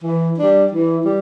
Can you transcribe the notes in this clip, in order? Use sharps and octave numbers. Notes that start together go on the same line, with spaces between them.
E3
G3 D4
E3
G3